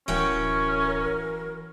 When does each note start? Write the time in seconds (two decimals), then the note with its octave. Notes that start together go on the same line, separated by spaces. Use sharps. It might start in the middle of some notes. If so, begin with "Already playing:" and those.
0.08 D1 E3 C#4 F#4 A#4 G5